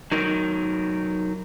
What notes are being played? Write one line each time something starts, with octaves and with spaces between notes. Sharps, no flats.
F#3 D#4 A#4